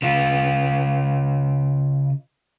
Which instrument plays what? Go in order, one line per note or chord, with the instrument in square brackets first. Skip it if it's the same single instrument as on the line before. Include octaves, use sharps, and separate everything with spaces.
[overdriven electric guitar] C#3 F4